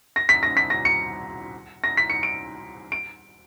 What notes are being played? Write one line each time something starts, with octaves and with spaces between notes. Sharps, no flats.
A#6
B6
A#6
B6
A#6
C#7
A#6
B6
C#7
D7
D7